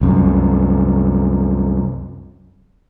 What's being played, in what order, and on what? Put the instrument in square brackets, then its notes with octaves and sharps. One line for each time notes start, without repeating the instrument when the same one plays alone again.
[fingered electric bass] C2 F#2